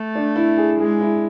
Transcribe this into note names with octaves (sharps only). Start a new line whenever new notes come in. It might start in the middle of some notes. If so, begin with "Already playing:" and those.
Already playing: A3
D4
E4
G#4
G#3 G#4
E4